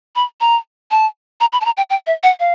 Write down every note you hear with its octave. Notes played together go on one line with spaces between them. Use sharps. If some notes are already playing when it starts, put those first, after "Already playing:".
B5
A#5
A5
A#5
B5
A5
A#5
G5
G5
E5
F#5
F5